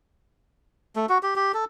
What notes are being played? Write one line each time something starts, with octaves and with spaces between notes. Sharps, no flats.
A3
F#4
G4
G4
A4